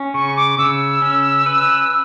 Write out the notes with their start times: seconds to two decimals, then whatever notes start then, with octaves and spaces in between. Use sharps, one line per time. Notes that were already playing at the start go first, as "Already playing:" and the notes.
Already playing: C#4
0.14 C#3 C#6
0.36 D6
0.58 C#3 E6
1.02 C#4
1.46 B4